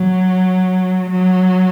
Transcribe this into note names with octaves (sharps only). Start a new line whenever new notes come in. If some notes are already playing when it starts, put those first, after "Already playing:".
Already playing: F#3
F#3